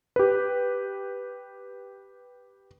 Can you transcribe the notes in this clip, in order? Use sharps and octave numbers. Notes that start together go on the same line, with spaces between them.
G4 B4